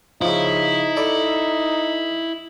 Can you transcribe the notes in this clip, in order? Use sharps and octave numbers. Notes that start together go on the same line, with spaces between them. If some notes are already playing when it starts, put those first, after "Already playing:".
C#3 F3 D#4 E4
A4 D5 B5